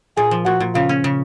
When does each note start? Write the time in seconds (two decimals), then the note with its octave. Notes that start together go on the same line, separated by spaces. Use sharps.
0.17 A#2 G#4
0.31 F3
0.45 A#2 F#4
0.60 A#2
0.75 C#3 F4
0.89 C#4
1.04 C#3